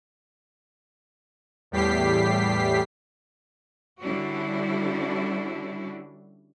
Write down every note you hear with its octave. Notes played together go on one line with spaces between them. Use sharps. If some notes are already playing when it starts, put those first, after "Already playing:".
E2 A2 G3 G4 B6 C7
D3 G3 C#4 D4 E4 F#4